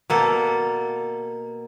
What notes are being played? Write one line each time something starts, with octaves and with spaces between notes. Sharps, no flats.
B2 A#3 A4